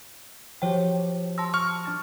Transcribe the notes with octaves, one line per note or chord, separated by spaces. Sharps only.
F3 F#4 G4 C#5 G5
A5 C6 E6 A#6
C#6 F6
D4 A6 E7